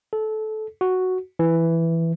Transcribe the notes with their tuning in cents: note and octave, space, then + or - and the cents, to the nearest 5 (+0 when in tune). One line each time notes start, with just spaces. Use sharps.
A4 -20
F#4 +0
E3 +5